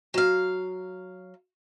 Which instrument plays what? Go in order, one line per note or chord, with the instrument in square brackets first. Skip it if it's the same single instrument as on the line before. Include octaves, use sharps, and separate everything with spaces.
[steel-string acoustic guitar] F#3 F5